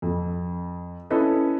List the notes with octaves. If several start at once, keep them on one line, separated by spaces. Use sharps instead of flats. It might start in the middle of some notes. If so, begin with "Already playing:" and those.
F2
C#4 E4 A4 B4 D#5